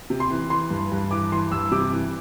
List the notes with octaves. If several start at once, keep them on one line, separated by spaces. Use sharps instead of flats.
C3
C6
E3
E3 C6
G2
G2
E3 D6
E3 C6
G2 E6
C3 D6
E3